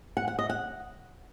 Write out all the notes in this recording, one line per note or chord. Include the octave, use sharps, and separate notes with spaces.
F#5
F#5
D#5
F#5